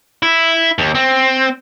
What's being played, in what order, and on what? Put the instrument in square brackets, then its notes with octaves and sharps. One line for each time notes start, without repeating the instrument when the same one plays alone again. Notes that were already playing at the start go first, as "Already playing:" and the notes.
[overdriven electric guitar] E4
D#2
C4